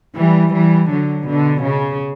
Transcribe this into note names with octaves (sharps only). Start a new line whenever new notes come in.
E3 G3
E3 G3
D3 F#3
B2 D3
C#3